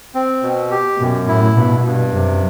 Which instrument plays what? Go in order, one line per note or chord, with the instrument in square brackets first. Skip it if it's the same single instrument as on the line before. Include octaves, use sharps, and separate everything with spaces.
[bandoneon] C4
B2
G4
[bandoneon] F#2 [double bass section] B2
[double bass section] A2 [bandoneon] E4
[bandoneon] G2 [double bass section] B2
[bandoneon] G2
[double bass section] F#2 [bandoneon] C3